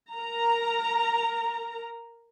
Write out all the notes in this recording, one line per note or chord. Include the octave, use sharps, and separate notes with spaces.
A#4 A#5